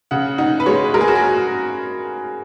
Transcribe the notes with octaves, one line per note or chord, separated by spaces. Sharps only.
C#3 F#5
D#4 F#5
B4
G#3 C#5
G#3 A#4
G#4
F#4
G#4